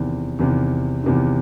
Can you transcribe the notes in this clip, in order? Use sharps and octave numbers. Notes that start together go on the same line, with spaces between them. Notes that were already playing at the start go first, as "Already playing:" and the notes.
Already playing: E2 C3 D#3
E2 C3 D#3
E2 C3 D#3